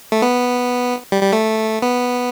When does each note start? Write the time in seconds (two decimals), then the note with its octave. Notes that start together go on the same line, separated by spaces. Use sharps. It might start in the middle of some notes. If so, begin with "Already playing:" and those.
0.12 A3
0.22 B3
1.12 G3
1.22 G3
1.33 A3
1.82 B3